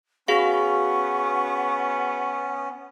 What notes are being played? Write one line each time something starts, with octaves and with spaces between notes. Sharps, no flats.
B3 C#4 F#4 G#4 F5 C#6